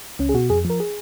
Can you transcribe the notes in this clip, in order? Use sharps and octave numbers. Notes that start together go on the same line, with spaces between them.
C#2 C#4
G#4
B2 F#4
F2 G#4
F3 A#4
G#4